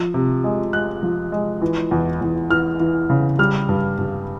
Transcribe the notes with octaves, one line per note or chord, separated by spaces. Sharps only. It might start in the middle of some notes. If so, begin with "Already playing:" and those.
Already playing: F3
C3
G#3
G#3 F#6
F3
G#3
E3
E2
E2
E3 F6
E3
C#3
G3 F6
G2
G2